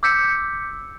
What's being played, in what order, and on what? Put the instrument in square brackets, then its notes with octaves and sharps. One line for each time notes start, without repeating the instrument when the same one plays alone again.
[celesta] D6 E6 G6 B6 C#7